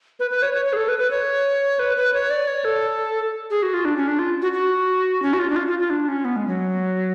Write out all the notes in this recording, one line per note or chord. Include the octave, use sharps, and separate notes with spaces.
B4
B4
C#5
C#5
C#5
G#4
A4
B4
B4
C#5
B4
B4
C#5
D5
C#5
A4
G#4
F#4
F4
D4
C#4
D4
F4
F#4
F#4
C#4
F#4
F4
D4
F4
F4
F4
D4
C#4
B3
G#3
F#3